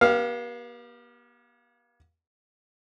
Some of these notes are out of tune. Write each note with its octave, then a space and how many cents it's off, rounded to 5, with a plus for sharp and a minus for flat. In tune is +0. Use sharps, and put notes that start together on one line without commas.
B3 -45 G4 -15 F5 +0